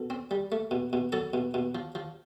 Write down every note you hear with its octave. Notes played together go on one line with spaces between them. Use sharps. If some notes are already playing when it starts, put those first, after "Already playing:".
Already playing: B2 A4
C4
G3
A3
B2
B2
F#3 A4 A5
B2
B2
F3
F3